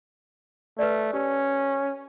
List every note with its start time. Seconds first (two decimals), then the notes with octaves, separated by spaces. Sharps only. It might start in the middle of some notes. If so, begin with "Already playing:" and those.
0.79 A3 B4 D5
1.14 C#4 G4